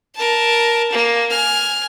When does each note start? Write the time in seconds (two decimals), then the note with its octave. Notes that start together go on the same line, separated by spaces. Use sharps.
0.16 A#4 A5
0.92 A#3
1.31 G#5 F6